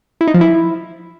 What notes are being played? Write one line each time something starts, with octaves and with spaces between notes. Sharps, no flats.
E4
D#4
F3
E4